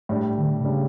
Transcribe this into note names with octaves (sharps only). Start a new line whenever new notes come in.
A2 G3 D4
D3
B2
A2 C#3 G3 D4